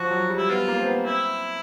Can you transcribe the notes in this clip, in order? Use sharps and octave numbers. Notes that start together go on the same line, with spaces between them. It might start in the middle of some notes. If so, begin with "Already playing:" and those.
Already playing: F3 F#4
F#3
G3
E4
B3 F4
A#3
C4
B3
C4 E4